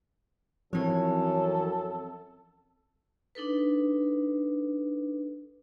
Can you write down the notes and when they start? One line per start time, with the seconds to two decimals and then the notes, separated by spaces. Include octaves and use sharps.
0.73 F#2 E3 F3 C4 A4 C#5
3.35 D4 D#4 A4 B4